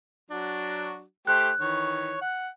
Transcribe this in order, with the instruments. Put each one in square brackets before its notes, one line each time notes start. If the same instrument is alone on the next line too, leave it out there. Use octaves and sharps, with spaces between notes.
[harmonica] F#3 D4 F#4
[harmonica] A3 G4 C5 [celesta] F#6
[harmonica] D#3 E3 C#5
F#5